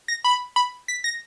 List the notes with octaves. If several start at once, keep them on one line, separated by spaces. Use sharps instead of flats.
A#6
B5
B5
B6
A#6